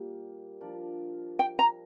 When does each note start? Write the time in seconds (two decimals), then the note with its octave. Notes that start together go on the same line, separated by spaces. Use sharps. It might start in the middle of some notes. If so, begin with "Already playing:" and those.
Already playing: A#2 G3 A#3 G4
0.61 F3 D4 A#4 D5
1.39 G5
1.59 A#5